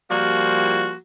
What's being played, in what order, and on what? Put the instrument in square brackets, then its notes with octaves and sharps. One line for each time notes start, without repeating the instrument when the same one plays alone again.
[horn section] F3 G3 A#3 [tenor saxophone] F#4